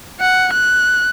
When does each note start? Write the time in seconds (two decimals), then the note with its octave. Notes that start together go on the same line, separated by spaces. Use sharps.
0.21 F#5
0.53 F#6